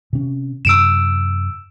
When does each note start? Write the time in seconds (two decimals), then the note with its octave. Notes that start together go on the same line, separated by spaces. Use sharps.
0.13 C3 C#4
0.65 F#2 C3 E6 D7 E7